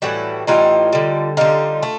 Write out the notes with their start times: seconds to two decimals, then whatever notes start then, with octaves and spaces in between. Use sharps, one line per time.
0.02 A2 E3 G3 E4 F#4
0.47 A2 E3 G3 D#4 F4
0.93 D3 G3
1.37 D3 G3 D#4 F4
1.83 A3